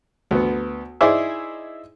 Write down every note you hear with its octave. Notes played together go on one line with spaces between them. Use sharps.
D2 B3
D#4 E4 G#4 C5 D5 E5